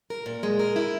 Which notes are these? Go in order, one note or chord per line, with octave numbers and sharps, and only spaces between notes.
A#4
A#2
G#3
A#4
E4